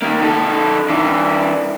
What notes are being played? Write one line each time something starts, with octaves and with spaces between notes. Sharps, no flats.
D#3 A#3
D#3 A4
E3 D4